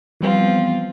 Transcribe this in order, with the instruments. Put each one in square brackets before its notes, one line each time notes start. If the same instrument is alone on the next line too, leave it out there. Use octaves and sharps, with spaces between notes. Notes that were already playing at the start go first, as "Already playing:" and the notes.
[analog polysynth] E3 G3 B3 [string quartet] F3 C4 F4